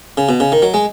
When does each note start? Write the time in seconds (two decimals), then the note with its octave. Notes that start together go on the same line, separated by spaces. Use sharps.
0.17 C#3
0.29 B2
0.40 C#3
0.52 D#3
0.62 F#3
0.74 G#3